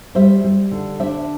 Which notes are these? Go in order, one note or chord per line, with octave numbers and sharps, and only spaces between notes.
G3 C5 E5
G3
D3
D4 C5 E5